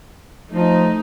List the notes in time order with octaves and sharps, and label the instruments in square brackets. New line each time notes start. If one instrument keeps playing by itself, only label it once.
[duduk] F3 [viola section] A3 D#4